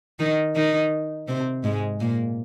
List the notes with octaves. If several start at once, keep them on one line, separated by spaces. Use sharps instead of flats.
D#3 D#4
D#3 D#4
C3 C4
G#2 G#3
A#2 A#3